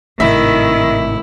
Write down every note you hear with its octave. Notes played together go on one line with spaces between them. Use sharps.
G#1 A2 C3 D#3 E4 E5